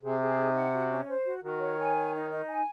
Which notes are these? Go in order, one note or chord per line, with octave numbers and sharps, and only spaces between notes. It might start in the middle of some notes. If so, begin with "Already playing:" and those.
C3 G#4
G#4
D#4
F#5
F#4
C#4
C5
F#4
D#3 F#4
C#5
G#5
C#5
D#4
D#4
G#5